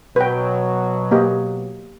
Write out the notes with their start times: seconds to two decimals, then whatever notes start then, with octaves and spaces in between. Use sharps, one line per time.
0.16 B2 F#3 B4 G5
1.11 A#3 G4 D#5